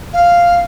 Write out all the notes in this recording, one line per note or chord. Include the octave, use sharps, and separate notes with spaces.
F5